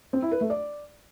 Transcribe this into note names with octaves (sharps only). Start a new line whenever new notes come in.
C4
E4
B4
A3
D5